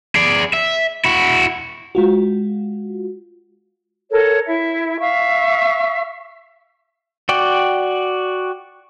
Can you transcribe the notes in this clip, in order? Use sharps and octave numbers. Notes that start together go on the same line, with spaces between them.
G#4 D5
E5
E4 F#4
G#3 F4 F#4
A4 A#4 C#5
E4 E5
E5 F5 C#6
F#4 D5 G5